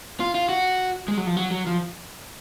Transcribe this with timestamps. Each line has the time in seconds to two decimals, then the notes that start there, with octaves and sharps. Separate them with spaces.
0.20 F4
0.35 F4
0.49 F#4
1.08 G#3
1.17 F#3
1.27 F3
1.37 F#3
1.51 F#3
1.67 F3